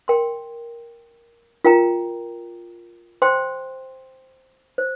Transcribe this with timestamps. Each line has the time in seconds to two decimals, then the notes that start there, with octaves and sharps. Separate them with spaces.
0.08 A#4 G5 C6
1.65 F4 A#4 G5 A#5
3.22 C5 G5 C6
4.78 C5